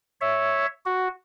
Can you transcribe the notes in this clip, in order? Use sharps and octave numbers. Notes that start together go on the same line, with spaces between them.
C#5 E5
F#4